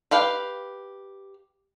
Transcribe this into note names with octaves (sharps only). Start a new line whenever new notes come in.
G4 B4 F5 G5